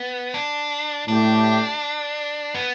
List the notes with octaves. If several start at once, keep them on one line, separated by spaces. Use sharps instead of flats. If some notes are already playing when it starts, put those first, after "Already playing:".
Already playing: B3
D4
A2 A3 D4 G4
B3